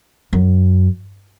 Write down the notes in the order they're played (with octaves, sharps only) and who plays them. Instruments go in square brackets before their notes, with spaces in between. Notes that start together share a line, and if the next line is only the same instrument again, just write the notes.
[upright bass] F#2